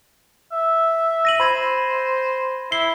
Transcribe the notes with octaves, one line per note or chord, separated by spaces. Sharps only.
E5
A#6 D#7 F#7
C5 B5 G#6 A#6
E4 C7 G7